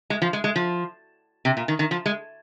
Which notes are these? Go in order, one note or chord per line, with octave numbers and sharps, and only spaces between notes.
G#3
F3
G#3
G#3
F3
C3
A#2
D#3
D#3
F3
G#3